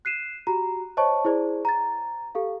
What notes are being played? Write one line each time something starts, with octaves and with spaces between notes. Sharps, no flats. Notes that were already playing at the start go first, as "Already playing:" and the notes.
F#6 C7 D#7 E7
F#4 G4 A#5
C5 C#5 D#5 A5 C#6
E4 G#4 C5 D5
A#5 A6
G4 A4 F5